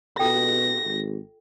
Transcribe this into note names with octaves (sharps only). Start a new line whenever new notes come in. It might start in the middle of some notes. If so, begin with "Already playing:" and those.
B2 F4 A4 G5 A#6
G#1